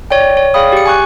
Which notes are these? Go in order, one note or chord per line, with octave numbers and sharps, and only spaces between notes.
C#5 D5 G5
C#5
G#4 D5 F5 G5 B5 D#6
G4 C#7
G#5 C#6 F#6